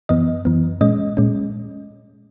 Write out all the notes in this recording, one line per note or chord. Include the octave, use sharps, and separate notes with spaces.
F#2 E3 B3 D#5
F#2 E3 B3
A#2 G#3 C#4 D#5
A#2 G#3 C#4